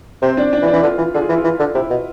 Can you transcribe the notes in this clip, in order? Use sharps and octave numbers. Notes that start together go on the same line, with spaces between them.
C3 C4 C5
D4 D5
D4 D5
E3
D4 D5
E3
D3 F4
E3
D3 G#4
F4
E3 E4
F4
E3
D3
C3 E4
B2